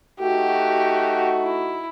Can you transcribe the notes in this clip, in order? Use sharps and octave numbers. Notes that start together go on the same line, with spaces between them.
A3 D#4 F#4 G4
E4